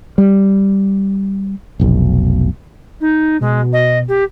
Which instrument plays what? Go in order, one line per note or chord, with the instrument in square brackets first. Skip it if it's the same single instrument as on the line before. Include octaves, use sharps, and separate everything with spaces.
[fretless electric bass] G3
F1 B1
[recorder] D#4
[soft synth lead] B2 [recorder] G#3
[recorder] D#5
G4